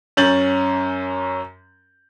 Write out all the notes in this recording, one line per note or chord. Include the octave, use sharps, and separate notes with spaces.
F#2 C#4 G6 A6 F#7